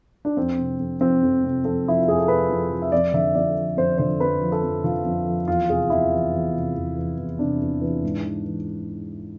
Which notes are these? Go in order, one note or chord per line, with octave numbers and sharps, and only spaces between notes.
D4
F2 C4
C3
F2
F3 C4
F2
C3
F2 A4
F3 E4
F4
F2 G#4
A4
C3 B4
F2
F3
E5
F2 D5
D3 E5
F2 D5
F3
F2 C5
D3 C5
F2 B4
F3
A4
F2
D3 F4
F2
F3
E2 F4
C3 G#4
E2 E4
E3
E2
C3
E2
E3
E2
C3 D4
E2
E3
G#2
E3
E3